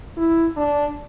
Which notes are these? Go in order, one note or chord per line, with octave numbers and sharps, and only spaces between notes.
E4
D4